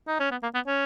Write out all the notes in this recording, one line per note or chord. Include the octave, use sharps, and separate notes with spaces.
D#4
C#4
B3
A#3
B3
C#4